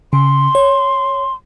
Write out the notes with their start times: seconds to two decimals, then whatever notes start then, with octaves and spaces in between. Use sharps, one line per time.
0.13 C#3 C6
0.55 C#5